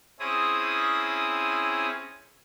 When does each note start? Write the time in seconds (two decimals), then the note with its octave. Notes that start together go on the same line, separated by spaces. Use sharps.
0.20 C4 C#4 E4 G#4 D#6